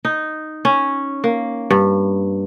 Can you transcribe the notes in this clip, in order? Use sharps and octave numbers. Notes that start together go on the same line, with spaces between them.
D#4
C#4
A#3
G2